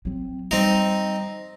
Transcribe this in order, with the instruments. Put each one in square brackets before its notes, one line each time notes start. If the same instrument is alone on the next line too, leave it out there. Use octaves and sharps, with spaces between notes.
[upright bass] F#3 C4
[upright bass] G3 [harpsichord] C4 D#4